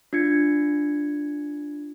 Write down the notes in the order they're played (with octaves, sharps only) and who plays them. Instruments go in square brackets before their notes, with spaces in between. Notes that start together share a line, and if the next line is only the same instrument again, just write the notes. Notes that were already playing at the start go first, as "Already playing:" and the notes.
[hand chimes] D4 F4 G#6 C#7